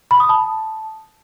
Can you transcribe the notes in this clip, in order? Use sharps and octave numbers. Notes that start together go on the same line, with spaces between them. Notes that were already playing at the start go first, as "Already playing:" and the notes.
B5
D#6
A5